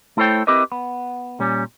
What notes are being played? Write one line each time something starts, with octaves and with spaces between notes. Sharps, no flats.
A3 E4 A4 C5 C#5 G5
C4 E4 G4 A#4 B4 D#5
B3
A#2 G3 C#4